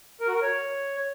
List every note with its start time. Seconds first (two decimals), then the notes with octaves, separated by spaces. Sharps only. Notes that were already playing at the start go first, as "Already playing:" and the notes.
0.21 A#4
0.28 F#4
0.35 A#4
0.42 C#5